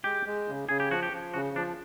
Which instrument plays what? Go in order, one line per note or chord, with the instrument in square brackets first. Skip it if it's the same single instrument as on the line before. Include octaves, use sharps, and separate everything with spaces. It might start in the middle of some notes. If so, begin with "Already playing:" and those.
[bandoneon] G#3 [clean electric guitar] G4
[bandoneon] G#3
C#3
[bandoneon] C#3 [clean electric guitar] G#4
[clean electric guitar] G4
[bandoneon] F3 [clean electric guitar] F#4
[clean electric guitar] G4
[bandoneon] F3
[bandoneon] C#3 [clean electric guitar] F#4
[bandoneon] F3 [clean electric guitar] D4